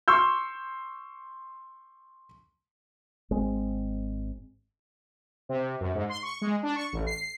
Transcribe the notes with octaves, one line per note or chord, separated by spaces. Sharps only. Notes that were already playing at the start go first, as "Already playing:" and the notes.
C6 C#6 E6 G6
G#1 G#3 C4
C3
F#2
G#2
C6
C#6
G#3
D4
C#6
A1
C7